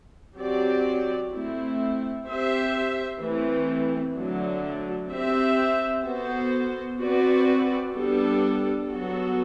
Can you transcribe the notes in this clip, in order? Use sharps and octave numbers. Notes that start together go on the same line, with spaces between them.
F#3 C4 G4 D5
A3 C4 E4
C4 G4 C5 E5
E3 A3 C4
D3 F#3 A3 D4
C4 G4 C5 E5
B3 F#4 A4 C5
C4 F#4 B4 D5
G3 B3 D4 A4
F#3 B3 F#4 A4